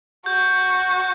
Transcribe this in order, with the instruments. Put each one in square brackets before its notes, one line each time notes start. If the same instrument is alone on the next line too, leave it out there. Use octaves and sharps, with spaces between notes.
[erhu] F#4 [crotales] G6
[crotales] G6